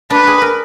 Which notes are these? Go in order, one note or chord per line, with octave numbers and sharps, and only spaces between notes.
D4 B4
G#4
A#4